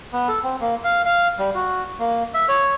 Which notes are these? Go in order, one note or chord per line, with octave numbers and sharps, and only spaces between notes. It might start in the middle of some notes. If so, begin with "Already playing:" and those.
B3
A4
C4
A#3
F5
F5
G3
F#4
A#3
E5
C#5